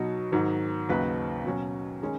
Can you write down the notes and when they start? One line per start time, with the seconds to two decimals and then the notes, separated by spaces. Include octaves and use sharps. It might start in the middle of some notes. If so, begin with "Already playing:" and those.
Already playing: B2 F#3 D#4 F#4
0.32 G#2 D#3 F#3
0.89 D#2 C#3 F#3 D#4 B4
1.44 B2 F#3 C#4
2.02 D#3 G#3 C#4